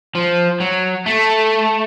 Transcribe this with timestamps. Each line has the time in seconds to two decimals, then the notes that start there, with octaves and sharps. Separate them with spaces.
0.15 F3
0.61 F#3
1.06 A3